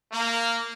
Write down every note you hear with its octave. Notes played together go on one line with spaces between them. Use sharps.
A#3